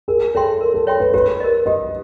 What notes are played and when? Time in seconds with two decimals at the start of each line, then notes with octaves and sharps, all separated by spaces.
0.08 G#4 A#4
0.34 A4 C#5 E5 G5 C6
0.61 A#4
0.74 A4
0.87 C#5 E5 G5 C6
1.00 B4
1.14 G4 B4
1.40 A#4 D#5
1.66 G4 D#5